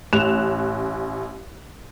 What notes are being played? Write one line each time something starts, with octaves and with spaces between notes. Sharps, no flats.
A1 F#6 E7 F7